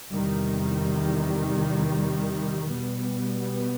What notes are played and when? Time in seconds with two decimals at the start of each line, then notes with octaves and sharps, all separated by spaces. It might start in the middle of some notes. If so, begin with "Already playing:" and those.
0.12 E2 C3 D#3 G3
2.68 B2 G3 B3